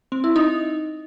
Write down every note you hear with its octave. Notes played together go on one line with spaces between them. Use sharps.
C4
E4
D#4